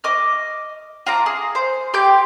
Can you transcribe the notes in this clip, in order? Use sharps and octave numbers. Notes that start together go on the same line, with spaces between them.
D#5 D6 F6
F4 A5 A#5 D6
G#4
C5
G4 C6 D6 G6